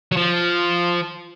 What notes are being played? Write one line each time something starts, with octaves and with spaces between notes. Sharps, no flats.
F#3
F3